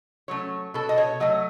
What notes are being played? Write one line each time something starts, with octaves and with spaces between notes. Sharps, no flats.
F#3 A3 C#4 C#5
B2 A4
D#5
C#5
F#3 A3 D#5